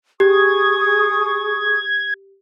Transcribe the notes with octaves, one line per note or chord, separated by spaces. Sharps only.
G4 G#4 C#6 D#6 G#6